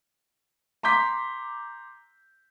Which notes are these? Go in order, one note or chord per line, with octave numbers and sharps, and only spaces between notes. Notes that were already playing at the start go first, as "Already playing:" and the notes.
A#5 C6 D6 G6 B6